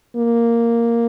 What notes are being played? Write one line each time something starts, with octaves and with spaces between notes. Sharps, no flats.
A#3